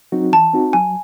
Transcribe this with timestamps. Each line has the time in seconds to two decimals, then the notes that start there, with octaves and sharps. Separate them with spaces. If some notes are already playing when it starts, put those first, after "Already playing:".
0.12 F#3 C4 D#4 F#4
0.33 E3 A5
0.54 C4 D#4 F#4
0.73 F#3 G#5